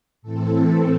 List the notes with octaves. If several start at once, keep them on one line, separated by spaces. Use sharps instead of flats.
A2 E3 C4 A4